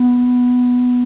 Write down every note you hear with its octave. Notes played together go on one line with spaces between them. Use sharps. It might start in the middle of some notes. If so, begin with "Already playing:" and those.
Already playing: B3